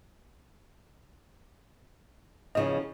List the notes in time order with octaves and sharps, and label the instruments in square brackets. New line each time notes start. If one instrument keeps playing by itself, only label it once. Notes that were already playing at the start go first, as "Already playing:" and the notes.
[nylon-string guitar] E2 C#3 F3 [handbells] D#5